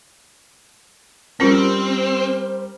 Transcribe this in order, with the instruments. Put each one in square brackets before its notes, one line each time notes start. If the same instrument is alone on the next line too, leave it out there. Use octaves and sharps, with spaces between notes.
[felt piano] G3 A#4 [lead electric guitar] C4 [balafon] C#4 F4 [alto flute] C5